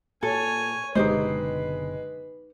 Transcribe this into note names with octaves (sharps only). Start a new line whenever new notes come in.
A#2 A4 C#5 G#5
F#1 B2 D3 G#3 D#4 G4 B4 C5